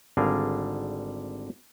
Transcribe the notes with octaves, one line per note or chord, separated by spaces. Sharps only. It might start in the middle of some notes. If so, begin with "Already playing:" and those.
G#1 D3 G3 G#4 A#4 F5